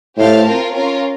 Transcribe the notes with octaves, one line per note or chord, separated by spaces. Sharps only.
A2 G4 C5 F5 A5
C4 F4 A#4
C#4 F4 A#4